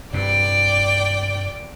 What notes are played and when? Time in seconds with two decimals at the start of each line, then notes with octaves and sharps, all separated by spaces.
0.13 G2 C3 D5 G5